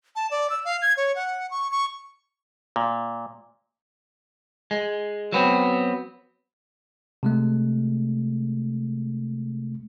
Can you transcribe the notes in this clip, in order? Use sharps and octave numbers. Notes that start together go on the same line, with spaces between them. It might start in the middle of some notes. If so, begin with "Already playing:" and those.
A5
D5
E6
F5
G#6
C#5
F#5
C#6
C#6
A#2
G#3
F#3 B3 C4
C3 G#3 A3